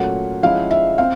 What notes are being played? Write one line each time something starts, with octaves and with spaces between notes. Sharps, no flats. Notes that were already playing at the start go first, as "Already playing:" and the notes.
Already playing: A#2 F#3 A3 C#4 F#5
F3 G#3 C#4 E4 F5
E5
C4 F5